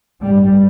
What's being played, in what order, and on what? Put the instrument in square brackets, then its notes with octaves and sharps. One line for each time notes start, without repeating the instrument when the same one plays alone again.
[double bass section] A1 G2 G3